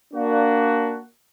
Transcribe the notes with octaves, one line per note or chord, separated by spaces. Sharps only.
A#3 D4 F#4